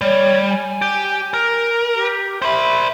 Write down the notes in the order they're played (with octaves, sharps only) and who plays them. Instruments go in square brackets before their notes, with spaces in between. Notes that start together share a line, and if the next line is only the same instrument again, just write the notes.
[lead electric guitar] G3 [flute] C#5
[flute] G#5
[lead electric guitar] G4
A#4
[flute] G4
[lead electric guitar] C5 B5 [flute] E5